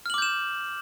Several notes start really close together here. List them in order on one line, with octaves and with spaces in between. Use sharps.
F6 F#7 D6 G6 E7